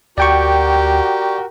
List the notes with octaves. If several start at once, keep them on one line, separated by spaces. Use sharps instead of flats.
D2 F#4 G4 A#4 D5 G5 C#6